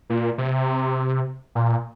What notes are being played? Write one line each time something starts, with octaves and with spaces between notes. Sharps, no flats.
A#2
C3
A#2